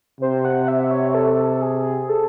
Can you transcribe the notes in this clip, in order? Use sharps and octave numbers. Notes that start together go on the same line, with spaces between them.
C3 C5
F#5
E5
C#5
A4
G#4
A4